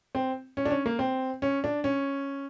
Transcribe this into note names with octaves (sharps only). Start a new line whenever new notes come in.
C4
C#4
D4
C#4
A#3
C4
C#4
D4
C#4